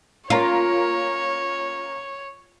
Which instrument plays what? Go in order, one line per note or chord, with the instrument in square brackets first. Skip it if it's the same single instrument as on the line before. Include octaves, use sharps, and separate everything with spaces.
[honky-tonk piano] A#3 C#4 A#4 [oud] F4 [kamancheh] C#5